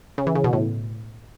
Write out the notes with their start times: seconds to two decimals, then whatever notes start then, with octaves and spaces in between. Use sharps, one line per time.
0.18 C#3
0.27 E3
0.35 C#3
0.44 B2
0.53 A2